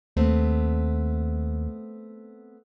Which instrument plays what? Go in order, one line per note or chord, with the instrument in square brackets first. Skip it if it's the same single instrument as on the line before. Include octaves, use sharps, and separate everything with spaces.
[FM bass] D#2 [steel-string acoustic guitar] A3 B3 C4